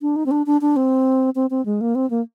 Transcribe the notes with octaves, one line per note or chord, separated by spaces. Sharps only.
D4
D#4
C4
D4
D4
D4
C4
C4
C4
G#3
A#3
C4
A#3